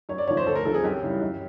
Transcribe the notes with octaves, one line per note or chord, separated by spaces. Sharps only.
F#2 C#5
D5
C#3 F3 C#5
C5
D2 A4
A#4
C3 F3 A4
G#4
F#2 G4
C#3 E3 G3
F#2